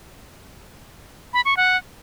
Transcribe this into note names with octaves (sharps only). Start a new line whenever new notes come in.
B5
C#6
F#5